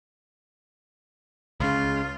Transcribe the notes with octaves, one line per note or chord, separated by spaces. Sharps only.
C#2 C#3 F4